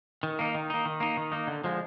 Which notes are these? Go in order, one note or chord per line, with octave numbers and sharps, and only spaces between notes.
D#3
A#3 D#4
D#3
A#3 D#4
D#3
A#3 D#4
D#3
A#3 D#4
D3
F3 G#3